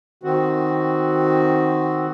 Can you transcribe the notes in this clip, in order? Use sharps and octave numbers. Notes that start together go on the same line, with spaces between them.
D#3 C4 F#4